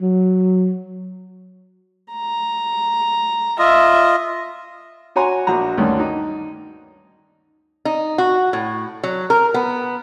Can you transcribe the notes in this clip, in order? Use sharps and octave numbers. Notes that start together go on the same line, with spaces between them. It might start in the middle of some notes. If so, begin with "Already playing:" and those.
F#3
A#5
F4 D#5 E5
F#4 C#5 G#5 A#5 C6
A#1 D4 F#4 A#5
D2 G2 D#3 C#4
D#4
D#4
F#4
A2
F#3
A#4
B3